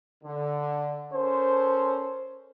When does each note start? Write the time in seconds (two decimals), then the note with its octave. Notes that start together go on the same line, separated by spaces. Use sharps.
0.24 D3
1.13 C#4 A4 A#4 C5